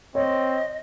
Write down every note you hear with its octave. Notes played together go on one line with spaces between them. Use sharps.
C4 C#5 D#5